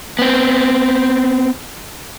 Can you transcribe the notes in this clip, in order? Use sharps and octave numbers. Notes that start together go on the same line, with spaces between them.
B3 C4